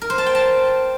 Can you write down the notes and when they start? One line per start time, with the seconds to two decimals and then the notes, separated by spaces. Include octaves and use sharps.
0.01 A#4
0.10 C5
0.18 A5
0.26 G5
0.35 A5